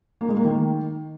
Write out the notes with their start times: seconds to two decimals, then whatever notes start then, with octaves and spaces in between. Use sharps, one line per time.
0.21 A#3
0.29 G#3
0.37 A#3
0.45 D#3